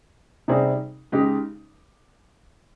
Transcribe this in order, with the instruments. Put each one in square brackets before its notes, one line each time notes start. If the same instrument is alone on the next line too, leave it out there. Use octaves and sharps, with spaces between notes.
[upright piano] C3 G3 C4 D#4 G#4
C#3 G#3 D#4 G4